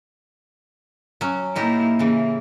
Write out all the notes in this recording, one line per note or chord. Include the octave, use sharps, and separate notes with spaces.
F#3 C#4
A2 A#3 D#4 E4 G4
C#3 E3 A#3